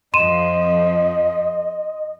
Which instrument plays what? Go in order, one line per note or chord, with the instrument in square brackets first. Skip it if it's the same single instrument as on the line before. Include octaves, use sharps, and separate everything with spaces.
[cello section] F2 F3 [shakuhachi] D#5 [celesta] C6 D#7 E7